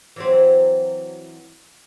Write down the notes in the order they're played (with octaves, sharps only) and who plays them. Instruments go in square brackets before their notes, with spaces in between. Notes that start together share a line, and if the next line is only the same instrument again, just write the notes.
[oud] E3 F#3 C4